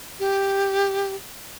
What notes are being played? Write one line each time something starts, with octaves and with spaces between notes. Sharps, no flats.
G4